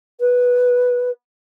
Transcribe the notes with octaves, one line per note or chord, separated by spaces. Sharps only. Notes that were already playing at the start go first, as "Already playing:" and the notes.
B4